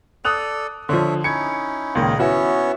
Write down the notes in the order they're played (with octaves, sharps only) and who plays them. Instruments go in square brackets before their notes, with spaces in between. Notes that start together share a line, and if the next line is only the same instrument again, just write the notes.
[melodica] A4 D5 [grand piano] D#6 F#6 F7
[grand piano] D3 F3 [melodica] C#5 E5
[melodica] C#4 D#4 E4 [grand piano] G#6 C#7
[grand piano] C#2 A#2 D#3 [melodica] G#4 D#5
[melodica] B3 C#4 C#5 [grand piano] E4 F#4 B4